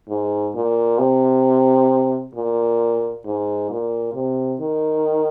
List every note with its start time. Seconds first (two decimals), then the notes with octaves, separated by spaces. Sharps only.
0.09 G#2
0.55 A#2
0.99 C3
2.35 A#2
3.25 G#2
3.70 A#2
4.14 C3
4.60 D#3